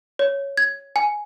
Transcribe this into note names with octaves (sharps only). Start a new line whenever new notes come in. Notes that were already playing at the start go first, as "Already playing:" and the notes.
C#5
G#6
G#5